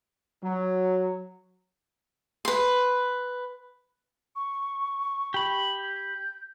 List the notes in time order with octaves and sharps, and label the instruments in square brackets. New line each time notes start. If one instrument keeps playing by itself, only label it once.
[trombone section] F#3
[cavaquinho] B4 C6
[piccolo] C#6
[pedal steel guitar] G4 B5
[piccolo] G6